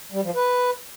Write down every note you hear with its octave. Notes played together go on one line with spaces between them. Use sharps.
G3
F3
B4